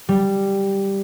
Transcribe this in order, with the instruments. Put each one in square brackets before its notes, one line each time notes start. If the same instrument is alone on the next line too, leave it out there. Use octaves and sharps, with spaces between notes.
[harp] G3